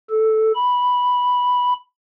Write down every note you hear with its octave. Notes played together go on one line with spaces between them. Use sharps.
A4
B5